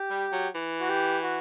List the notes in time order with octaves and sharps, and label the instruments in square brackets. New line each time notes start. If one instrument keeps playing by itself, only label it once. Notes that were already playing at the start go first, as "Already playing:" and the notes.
Already playing: [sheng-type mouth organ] G4
[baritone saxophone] G3
F#3
E3
[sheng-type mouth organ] F#4
G4
F#4